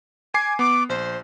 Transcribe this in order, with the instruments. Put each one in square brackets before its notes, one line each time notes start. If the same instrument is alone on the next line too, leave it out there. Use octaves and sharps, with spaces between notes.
[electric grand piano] G#5 D6 C7 [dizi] G#6
[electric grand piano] B3 [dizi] D6
[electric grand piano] A#1 [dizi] C5